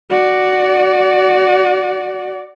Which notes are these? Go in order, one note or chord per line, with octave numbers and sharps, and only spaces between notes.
F#4 D5